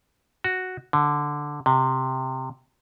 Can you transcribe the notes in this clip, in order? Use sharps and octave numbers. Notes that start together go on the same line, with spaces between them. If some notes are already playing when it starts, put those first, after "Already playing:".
F#4
D3
C3